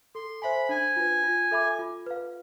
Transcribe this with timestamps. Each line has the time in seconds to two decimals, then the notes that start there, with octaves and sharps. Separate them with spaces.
0.15 A4 C6
0.42 C5 E5 G#5 B5
0.69 D4 G#5
0.96 F4 B4
1.24 F4
1.51 A4 E5 B5 D6
1.79 F4
2.06 B4 F5